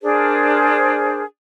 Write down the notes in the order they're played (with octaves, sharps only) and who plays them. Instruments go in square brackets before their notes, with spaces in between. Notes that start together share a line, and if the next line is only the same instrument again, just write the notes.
[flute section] D4 G#4 A#4 C5